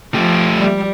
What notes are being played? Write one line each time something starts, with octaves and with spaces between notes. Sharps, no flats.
F3 A3 G4
G3